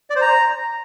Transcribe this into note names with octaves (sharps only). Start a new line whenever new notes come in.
D5
C5
A#5